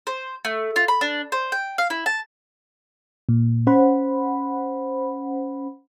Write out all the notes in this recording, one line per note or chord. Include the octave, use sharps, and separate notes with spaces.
C5
A3
F4
B5
D4
C5
G5
F5
E4
A5
A#2
C#4 C5 F#5 B5